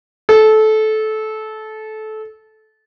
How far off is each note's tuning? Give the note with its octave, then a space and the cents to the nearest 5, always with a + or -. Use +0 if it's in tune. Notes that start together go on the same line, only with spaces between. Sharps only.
A4 -20